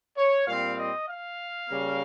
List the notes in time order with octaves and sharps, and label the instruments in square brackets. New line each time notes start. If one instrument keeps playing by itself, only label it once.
[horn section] C#5
A#2 G3 C4 F5
D#5
F5
C#3 G3 A#3